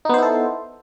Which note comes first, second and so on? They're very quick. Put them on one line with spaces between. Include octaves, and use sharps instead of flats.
D#4 B3 C5 E4 A4